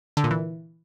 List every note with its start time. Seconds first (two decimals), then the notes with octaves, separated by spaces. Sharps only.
0.17 D3
0.24 A#2
0.31 E3